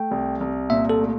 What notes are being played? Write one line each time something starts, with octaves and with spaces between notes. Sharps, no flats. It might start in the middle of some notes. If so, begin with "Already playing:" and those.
Already playing: A3 G5
C2
C2
A#2 E5
A4
A3